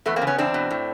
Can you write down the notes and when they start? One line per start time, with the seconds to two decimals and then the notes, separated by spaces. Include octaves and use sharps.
0.06 E2 A3 B3
0.16 A#3 C4
0.22 C#3
0.27 B3 C#4
0.38 E2 C4 D4
0.54 B2
0.71 A2